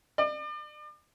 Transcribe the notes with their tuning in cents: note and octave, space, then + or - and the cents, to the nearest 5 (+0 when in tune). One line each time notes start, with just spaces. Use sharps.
D5 +40